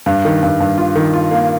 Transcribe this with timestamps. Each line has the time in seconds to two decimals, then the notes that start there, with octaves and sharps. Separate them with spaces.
0.06 G2
0.25 D#3
0.43 G2
0.60 G2
0.78 F4
0.95 D#3
1.14 F4
1.31 A#3